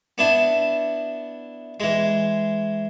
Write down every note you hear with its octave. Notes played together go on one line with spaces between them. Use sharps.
B3 D4 E4
E3 G#3